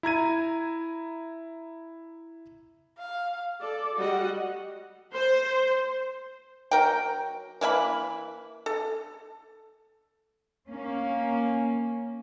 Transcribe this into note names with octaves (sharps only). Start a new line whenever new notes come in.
E4 A#5 G#6 D#7
F5
A4 D5
G3 F#4 D#5 F#5
C5
F#3 A#4 G5
E3 A#3 E5 B5
A4
A#3 C#4